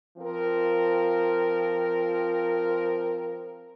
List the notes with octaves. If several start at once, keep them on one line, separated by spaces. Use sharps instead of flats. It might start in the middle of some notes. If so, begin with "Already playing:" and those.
F3 C4 F4 A#4